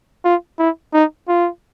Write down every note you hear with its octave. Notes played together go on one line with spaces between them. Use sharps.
F4
E4
D#4
F4